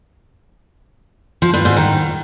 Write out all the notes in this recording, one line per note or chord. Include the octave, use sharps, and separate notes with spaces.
F3
G2
G#2
D#3